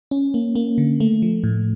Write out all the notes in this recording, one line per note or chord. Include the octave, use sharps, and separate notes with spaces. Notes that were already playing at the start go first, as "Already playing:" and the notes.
C#4
A#3
A#3
D3
A3
F3
A2